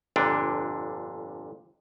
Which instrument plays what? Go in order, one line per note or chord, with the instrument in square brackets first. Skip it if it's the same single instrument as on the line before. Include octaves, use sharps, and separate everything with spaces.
[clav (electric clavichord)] G1 F2 A#2 D3 D4